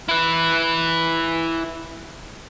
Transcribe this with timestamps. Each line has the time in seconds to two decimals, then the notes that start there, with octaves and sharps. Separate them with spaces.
0.09 E4 B4